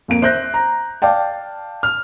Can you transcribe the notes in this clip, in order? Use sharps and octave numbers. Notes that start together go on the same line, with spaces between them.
F2 A#3 D7
C5 E5 F#6 G6 A#6
A#5
D5 F5 G5 A5
F6